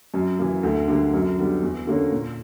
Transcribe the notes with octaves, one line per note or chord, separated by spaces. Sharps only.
F#2
E3 A#3
D2
D3 G3 A#3
F#2
D3 G3 B3
E2
D3 A#3 C#4
A#2